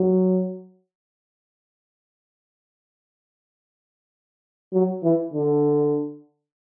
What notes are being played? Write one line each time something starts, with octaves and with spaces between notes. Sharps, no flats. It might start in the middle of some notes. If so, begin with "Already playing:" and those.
Already playing: F#3
F#3
E3
D3